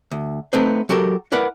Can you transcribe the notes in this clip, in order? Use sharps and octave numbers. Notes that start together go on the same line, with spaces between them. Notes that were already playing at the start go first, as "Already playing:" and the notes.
D2
A3 B3 C4 D#4 B4 C5
F#3 F#4 G4 A4 A#4
E4 A#4 B4 D5 F#5